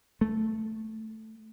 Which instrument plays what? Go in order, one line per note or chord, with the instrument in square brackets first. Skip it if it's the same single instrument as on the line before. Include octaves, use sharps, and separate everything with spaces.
[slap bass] A3